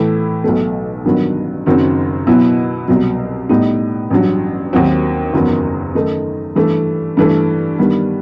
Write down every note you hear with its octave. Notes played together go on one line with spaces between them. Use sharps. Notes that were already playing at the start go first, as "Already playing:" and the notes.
Already playing: A2 E3 A3 E4
B1 B2 A3
A1 G2 D#3 F#3 B3
F#1 F#2 D#3 F#3 C4
B2 F#3 B3 E4
C2 B2 F#3
A2 G3 B3 D#4
A1 G2 F#3
D#2 D#3 F#3 C4 F#4
F#1 E2 D#3 F#3 B3
F#2 D#3 A3 D#4
G2 E3 A3
G2 E3 A3
G2 D#3 G3 B3